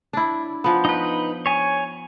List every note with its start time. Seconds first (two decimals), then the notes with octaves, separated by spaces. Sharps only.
0.13 D4 E4
0.64 F3 B3
0.85 D#4 B4
1.46 C#5 G#5